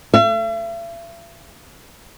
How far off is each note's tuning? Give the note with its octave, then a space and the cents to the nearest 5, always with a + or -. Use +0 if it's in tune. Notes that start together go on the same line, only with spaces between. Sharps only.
E5 +45